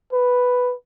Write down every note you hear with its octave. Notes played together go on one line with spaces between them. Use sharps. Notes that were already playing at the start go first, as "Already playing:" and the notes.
B4